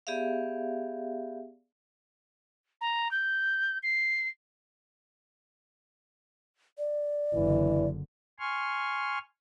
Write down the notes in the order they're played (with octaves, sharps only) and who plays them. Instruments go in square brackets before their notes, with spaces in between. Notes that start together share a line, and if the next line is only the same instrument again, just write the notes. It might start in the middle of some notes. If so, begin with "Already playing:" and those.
[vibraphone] B3 G4 G#4 D5 E5 F5
[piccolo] A#5
G6
C7
[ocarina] D5
[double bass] F#1 D3 [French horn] E3
[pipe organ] G#5 C6 C#6 F6